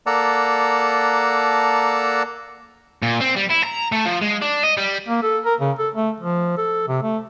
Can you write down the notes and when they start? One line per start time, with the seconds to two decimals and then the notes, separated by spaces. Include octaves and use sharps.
0.06 A#3 A4 D5 F#5 A5 A#5
3.02 A#2
3.21 C4
3.37 G3
3.50 E4
3.64 A#5
3.92 A3
4.05 F3
4.22 G#3
4.42 D4
4.63 D#5
4.77 G3
5.08 A#3
5.23 A4
5.45 A#4
5.60 C#3
5.79 A4
5.95 A3
6.20 F3
6.57 A4
6.88 C3
7.02 A3